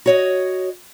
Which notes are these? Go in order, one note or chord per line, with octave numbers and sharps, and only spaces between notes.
F#4 C#5 D#5